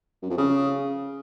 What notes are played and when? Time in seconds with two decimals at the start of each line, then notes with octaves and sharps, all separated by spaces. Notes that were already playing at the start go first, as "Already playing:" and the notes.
0.22 F#2
0.30 F2
0.38 C#3